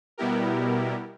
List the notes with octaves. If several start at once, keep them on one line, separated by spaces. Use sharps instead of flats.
B2 G3 B3 E4 G4 A#4